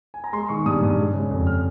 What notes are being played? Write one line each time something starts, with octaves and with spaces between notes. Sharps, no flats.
G#5
A#5
G#3 C6
D#3 C#6
G2 D#6
G2
G#3
C#3
F2
F6